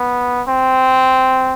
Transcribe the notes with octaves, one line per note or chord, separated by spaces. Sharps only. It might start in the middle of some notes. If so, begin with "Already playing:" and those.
Already playing: B3
C4